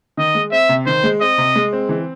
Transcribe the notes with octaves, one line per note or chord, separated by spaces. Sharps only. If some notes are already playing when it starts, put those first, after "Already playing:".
D#3 D#5
G#3
C4 E5
C3
D#3 C5
G#3
C4 D#5
C3
G#3
C4
E3